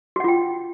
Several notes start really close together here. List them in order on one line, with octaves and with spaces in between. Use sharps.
F#4 F#5 F4 G5